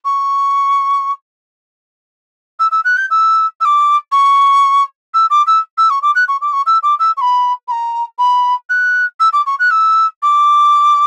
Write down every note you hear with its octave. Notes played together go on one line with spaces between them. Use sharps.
C#6
E6
E6
F#6
G6
E6
E6
D6
C#6
E6
D6
E6
E6
C#6
D6
F#6
C#6
D6
C#6
E6
D6
E6
C#6
B5
B5
A#5
B5
F#6
E6
D6
C#6
F#6
E6
D6